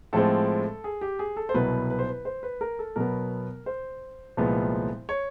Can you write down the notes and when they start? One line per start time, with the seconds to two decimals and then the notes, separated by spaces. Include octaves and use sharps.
0.13 A2 F3 G#3 C4 A4
0.84 G#4
1.01 G4
1.19 G#4
1.37 A4
1.49 C5
1.54 C2 B2 F#3 B3 B4
1.90 B4
1.99 C5
2.09 B4
2.25 C5
2.43 B4
2.61 A#4
2.79 A4
2.96 B2 F#3 B3 A#4
3.66 C5
4.37 C2 A#2 F3 G#3 B3
5.09 C#5